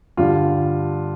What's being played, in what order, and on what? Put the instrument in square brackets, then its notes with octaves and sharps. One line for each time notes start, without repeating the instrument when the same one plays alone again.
[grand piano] G2 D3 G3 F4